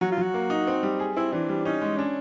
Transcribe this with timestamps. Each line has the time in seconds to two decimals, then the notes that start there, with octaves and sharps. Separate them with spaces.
0.01 F#3 F#4
0.12 F4
0.18 F#3 F#4
0.34 A#3
0.50 D#4
0.67 C4
0.83 G3
1.00 G#4
1.17 C4 E4
1.32 E3 D4
1.49 G3
1.65 C#4 D#4
1.82 G#3
1.98 C#4 D4